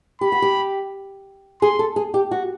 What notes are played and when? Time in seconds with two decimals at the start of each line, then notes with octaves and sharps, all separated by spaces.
0.21 G4 B5
0.32 F#4
0.42 G4
1.62 G#4 C6
1.79 A4
1.96 G#4
2.14 G4
2.31 F#4